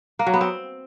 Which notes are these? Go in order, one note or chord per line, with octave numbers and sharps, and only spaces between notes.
A#3
F#3
B3
C4